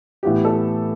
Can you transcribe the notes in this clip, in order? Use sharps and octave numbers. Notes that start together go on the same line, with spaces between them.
A2 E3 B3 G4
A4